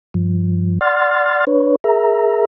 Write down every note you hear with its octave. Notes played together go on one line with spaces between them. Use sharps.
G2 F3
D5 F#5 C6 F6 A6
D4 B4 C#5
G#4 A#4 E5 A#5